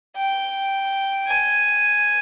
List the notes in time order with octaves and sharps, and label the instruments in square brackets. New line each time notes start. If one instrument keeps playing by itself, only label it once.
[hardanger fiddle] G5
G#5